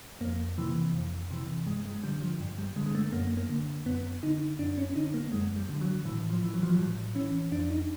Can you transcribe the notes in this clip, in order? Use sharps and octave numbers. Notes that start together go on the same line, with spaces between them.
F2 A#3
C3 E3
F2
C3 E3
G2 G#3
G#3
D3 G3
F3
G2
G3
D3 G#3
G#3
A3
F#2 A#3
A#3
D3
F#2 B3
D3 D#4
F#2 D4
C#4
D3 D#4
A#3
F#2 G#3
G3
D3
F#3
A2 E3
F3
E3
F#3
F3
F#3
A2 G3
E3 C#4
F2 D4
D#4